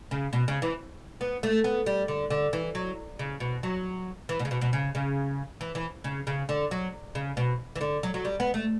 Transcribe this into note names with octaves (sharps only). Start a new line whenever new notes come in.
C#3
B2
C#3
E3
B3
A3
B3
G3
D3
D3
E3
F#3
C#3
B2
F#3
E3
B2
C#3
B2
B2
C#3
C#3
E3
E3
C#3
C#3
D3
F#3
C#3
B2
E3
D3
F#3
F#3
G3
B3
A3